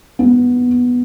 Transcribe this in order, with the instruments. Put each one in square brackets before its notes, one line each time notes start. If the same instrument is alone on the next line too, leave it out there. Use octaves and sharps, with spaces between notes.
[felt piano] B3